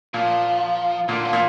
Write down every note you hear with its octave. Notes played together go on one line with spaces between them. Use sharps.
A#2 F3
A#2 D3
F3
A#2